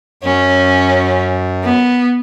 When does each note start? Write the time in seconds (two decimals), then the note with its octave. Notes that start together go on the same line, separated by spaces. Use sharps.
0.23 F#2 C#4
1.64 B3